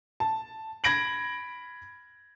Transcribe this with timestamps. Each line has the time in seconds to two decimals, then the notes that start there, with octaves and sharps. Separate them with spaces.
0.20 A5
0.84 B5 G#6 A#6 D7 F#7